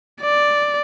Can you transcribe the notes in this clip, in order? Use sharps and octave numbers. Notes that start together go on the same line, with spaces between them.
D5